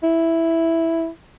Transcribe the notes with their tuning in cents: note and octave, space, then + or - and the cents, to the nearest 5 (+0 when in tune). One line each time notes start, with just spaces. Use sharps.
E4 +0